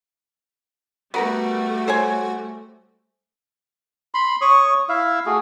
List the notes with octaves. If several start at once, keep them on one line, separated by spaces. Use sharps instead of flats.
G3 A3 B3 F#4 A#4 B4
C5 C#5 G#5
B5 C6
C#5 C#6 D#6
E4 E5 F5
A3 F#4 G#4